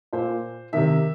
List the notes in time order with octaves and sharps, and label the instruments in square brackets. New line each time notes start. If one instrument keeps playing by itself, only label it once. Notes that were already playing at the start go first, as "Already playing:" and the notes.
[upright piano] A#2 C5
C3 D#3 E5